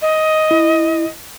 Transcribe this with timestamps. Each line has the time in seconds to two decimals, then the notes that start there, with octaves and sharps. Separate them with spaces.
0.02 D#5
0.51 E4